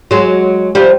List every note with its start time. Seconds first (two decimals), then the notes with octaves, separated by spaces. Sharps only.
0.11 F#3 G#3
0.75 F3 G3